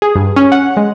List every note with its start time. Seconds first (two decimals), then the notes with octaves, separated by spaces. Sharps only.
0.02 G#4
0.15 G2
0.36 C#4
0.52 F#5
0.77 G#3